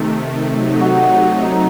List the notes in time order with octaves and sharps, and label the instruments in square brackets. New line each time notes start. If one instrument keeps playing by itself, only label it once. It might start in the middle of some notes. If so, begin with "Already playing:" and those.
Already playing: [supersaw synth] C3 D#3 A3
C3 F#3 A3 D#4
[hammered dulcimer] F#4
F#4
D#4